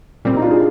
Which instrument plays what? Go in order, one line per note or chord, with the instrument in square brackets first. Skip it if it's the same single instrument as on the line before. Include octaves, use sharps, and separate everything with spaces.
[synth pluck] A#2 G3 C4
[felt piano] D#4
D4 F4
G#4